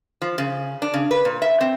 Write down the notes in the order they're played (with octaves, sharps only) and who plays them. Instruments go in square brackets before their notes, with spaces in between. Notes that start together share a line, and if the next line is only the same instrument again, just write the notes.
[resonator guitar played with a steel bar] F3
C#3
D4
C#3
B4
A#2
E5
C4